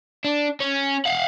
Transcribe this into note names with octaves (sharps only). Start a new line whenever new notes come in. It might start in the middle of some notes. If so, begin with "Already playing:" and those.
D4
C#4
F5 F#5